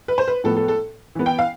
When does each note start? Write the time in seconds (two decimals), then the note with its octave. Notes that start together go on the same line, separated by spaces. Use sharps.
0.08 B4
0.18 C5
0.28 B4
0.44 A2 F3 B3 A4
0.57 A4
0.68 A4
1.15 E3 B3
1.26 G5
1.39 F5